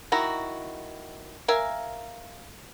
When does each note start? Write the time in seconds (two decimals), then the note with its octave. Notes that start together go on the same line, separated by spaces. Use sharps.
0.12 D#3 E4 F#4 A#5
1.48 A#4 E5 F5 G#5